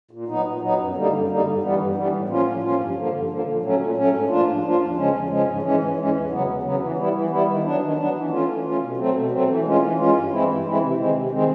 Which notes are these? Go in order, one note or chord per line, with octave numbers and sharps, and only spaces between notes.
A#2
F#3 B3 D#4
A#2
F#3 B3 D#4
F#2
D3 G3 A#3 D#4
F#2
D3 G3 A#3 D#4
G2
E3 G3 B3
G2
E3 G3 B3
A2
F3 A#3 C#4 F4
A2
F3 A#3 C#4 F4
G2
D3 F3 A#3
G2
D3 F3 A#3
A#2
F#3 A3 C#4
A#2
F#3 A3 C#4
G#2
F3 A#3 D4 F4
G#2
F3 A#3 D4 F4
E2
C#3 F3 G#3 C#4
E2
C#3 F3 G#3 C#4
G#2
E3 G#3 C#4
G#2
E3 G#3 C#4
E2
C#3 F#3 B3
E2
C#3 F#3 B3
E3
G3 B3 E4
E3
G3 B3 E4
D#3
F#3 B3 D4
D#3
F#3 B3 D4
E3
A3 C#4 F4
E3
A3 C#4 F4
B2
F#3 A3 C4
B2
F#3 A3 C4
E3
G#3 C#4 F4
E3
G#3 C#4 F4
G2
E3 G#3 C4 E4
G2
E3 G#3 C4 E4
C3
D#3 G#3 C4
C3
D#3 G#3 C4